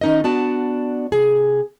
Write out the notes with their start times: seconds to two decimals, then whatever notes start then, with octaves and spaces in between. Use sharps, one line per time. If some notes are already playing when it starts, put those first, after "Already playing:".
0.01 D#3 C#4 D#4 A#4 D#5
0.24 B3 D4 F#4 D5 A5
1.12 C3 G#4